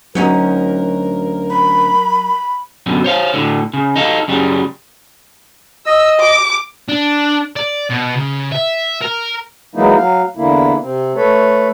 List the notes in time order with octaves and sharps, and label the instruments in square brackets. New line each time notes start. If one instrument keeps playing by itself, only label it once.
[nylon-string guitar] D2 C#4 D#4 [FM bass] F#3 [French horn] A#4
[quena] B5
[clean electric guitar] F#2 B2 D3
C5 C#5 F5
A2 D3
C#3
D#4 A4 F5
F#2 C#3 G3
[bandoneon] D#5 [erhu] E6
[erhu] D6
[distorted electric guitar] D4
D5
B2
C#3
E5
A#4
[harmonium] E3 F#3 G#3 A#3 D#4 E4
F#3 F5
E2 D3 A#3 E4
C3 C4
A3 A4 B4 C#5